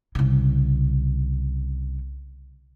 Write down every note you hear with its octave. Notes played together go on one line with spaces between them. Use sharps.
C2 C#3